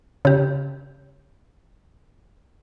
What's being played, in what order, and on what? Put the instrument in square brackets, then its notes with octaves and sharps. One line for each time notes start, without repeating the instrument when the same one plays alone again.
[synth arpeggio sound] C#3 G4